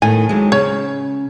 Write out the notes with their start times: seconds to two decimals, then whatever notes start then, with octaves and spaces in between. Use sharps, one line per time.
0.02 A2 D#3 G#5
0.29 D#2 F#3 G#3
0.52 C#3 C#5